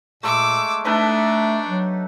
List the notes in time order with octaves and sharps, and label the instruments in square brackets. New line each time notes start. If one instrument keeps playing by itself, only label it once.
[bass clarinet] A#2 [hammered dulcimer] G#3 A3 [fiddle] D6 E6
[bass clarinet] A3 [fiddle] D4 [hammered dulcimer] D#4 A4 B4
[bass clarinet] F#3